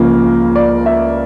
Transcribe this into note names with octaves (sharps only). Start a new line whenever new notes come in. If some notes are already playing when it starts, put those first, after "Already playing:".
Already playing: C#2 C#3 F3 A#3
D5
E5